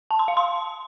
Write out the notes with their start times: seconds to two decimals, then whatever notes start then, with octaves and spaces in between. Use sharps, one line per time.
0.11 A5
0.19 C6
0.28 F5
0.37 C6